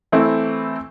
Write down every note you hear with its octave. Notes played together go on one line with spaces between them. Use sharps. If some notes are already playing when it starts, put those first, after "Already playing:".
E3 A3 C4 E4